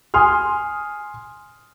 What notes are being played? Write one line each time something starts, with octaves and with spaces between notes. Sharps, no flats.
G#5 C6 D#6 F6